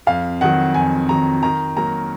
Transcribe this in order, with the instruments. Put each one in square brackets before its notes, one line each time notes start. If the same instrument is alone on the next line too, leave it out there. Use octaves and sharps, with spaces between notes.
[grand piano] F2 [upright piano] F5
[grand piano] D#3 F#3 [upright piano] F#5
[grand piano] F2 [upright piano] G#5
[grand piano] D#3 F#3 [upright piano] A#5
[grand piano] D#3 [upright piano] A#5
[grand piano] F#3 A#3 [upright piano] A#5